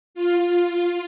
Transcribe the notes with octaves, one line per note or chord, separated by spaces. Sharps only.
F4